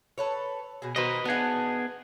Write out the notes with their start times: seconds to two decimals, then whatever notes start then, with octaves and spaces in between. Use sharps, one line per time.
0.18 A4 B4 C#5
0.82 B2 G#4
0.96 B2 D#3 B4 C5 D#5
1.25 B3 D4 D#4 G#4 F#5